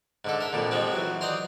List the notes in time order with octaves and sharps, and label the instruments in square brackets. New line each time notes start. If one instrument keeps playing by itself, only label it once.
[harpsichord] G#2 D3 A4
A#4 E5
F2 A#2 D3
F3 G3 G#3 C4
E3 F#3
D5 D#5 G5 A#5 C6